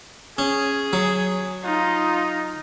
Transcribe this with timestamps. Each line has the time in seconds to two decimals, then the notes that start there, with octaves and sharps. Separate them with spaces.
0.38 C#4 G#4
0.93 F#3
1.64 D#4 F4